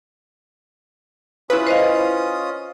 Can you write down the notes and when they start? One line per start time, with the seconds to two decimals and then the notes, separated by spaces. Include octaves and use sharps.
1.50 C#4 E4 F4 B4 D#6
1.67 C5 D#5 F5